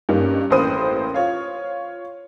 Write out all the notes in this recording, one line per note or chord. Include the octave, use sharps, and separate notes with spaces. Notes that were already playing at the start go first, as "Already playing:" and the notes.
G2 A#3 C#4 D#4
A1 A#3 B4 C5 D#6 D#7
F4 C#5 F5